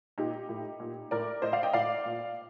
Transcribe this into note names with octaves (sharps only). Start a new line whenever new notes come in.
A#2 D#4 G4
A2
A#2
A2 A#4 D5
A2 C5 D#5
D5 F5
D#5 G5
A2 D5 F5
A#2